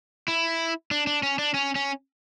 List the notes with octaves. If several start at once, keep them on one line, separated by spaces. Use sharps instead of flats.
E4
D4
D4
C#4
D4
C#4
C#4